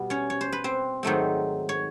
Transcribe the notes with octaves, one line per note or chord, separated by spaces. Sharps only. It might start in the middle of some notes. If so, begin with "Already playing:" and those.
Already playing: B2 G3 B3
C#4 C#5
C#5
C5
B4
C4 C5
G#2 D#3 F#3 A3 C4
C#5